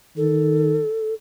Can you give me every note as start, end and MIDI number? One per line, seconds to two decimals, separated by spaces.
0.17 0.81 51
0.17 1.14 69